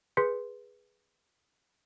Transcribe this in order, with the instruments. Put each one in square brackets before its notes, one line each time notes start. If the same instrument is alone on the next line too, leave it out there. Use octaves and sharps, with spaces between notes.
[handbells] G#4 B4 C6 G6 B6 C#7